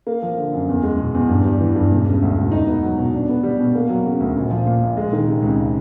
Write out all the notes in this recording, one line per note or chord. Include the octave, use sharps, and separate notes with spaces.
A#3
F3
D3
F#2
E2
G#3
B2
E2
G2
G3
E3
G2
E1
C#3
D2
E1
D#4
B3
F#3
B2
D4
B3
G3
B2
A#3
F#3
C#3
D2
A#1
F3
A#2
A#1
G#3
D#3
C3
C#2